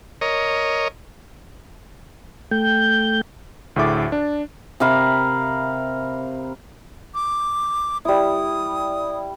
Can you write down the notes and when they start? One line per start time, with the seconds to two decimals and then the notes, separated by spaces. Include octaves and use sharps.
0.21 A#4 C#5 D#5
2.51 A3 G5 G6
3.76 D2 A2 G#4 E5 D6 A6
4.12 D4
4.80 C3 A#4 F5 B5
7.14 D6
8.05 G3 E4 D#6